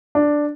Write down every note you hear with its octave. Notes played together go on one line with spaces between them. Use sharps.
D4